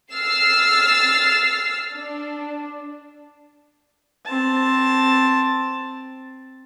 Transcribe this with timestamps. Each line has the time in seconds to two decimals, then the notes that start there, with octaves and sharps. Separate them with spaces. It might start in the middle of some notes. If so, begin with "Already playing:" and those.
0.11 E6 F6 A6 C7
1.97 D4
4.26 C4 A5